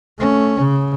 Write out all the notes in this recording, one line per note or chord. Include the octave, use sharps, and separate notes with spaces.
A3 C#4
C#3